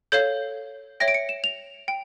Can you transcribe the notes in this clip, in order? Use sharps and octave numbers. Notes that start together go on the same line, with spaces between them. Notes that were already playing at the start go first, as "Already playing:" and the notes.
A4 C#5 F5 G6
C#5 E5 G5 A#6
D7
C#7
E7
F7
G5